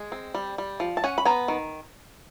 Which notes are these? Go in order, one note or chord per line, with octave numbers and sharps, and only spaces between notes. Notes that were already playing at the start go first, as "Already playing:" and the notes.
Already playing: G#3
C4
G3
G3
F3
A5
C#4 F#5 G#5
B5
B3 G#5 A#5
D#3